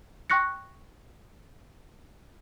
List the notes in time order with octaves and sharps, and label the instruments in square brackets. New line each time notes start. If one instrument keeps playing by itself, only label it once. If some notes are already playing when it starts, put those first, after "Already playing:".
[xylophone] G5 C6 C#6 F#6 A#6 C#7